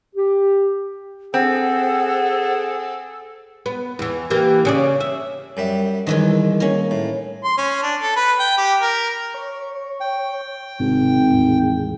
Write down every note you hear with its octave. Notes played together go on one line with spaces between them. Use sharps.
G4
C4 G#4 A4 F#5
B3
E2 E3
E3 A#3 G4
C#3 C#4 D5
E5
F#2 G3 E5
C2 D#3 E3 G#3
A#3 C#4
A2
C6
C#4
D4
A4
B4
G5
G4
A#4
C#5
G5
G#1 G#2 C3
E2 A2 G#3